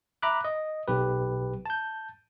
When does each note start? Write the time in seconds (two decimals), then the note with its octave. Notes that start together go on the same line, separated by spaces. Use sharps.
0.22 E5 A#5 B5 D6 F#6
0.44 D#5
0.88 B1 G4 B4
1.66 A5 G6